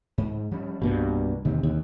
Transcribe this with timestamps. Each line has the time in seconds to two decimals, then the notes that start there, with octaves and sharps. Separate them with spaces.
0.18 G#2
0.51 F3 G3 C#4
0.82 C2 G2 B2 A#3
1.45 D#2 B2 D3 C4
1.63 D#2